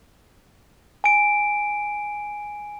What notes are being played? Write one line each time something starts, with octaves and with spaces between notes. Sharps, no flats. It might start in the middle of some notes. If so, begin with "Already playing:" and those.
G#5 D7